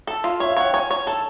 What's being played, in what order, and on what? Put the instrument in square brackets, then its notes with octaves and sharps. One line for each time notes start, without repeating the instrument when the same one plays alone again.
[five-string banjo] A4 [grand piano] A5
[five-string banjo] F4
[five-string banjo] C#5 [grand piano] E5
[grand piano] F5
[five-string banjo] C#5 [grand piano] F#5
[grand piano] G5
[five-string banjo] C#5 [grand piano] G#5
[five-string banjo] C#5
[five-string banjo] A4 [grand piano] A5